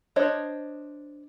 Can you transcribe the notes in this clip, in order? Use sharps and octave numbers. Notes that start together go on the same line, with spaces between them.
D4 C5 C#5 D#5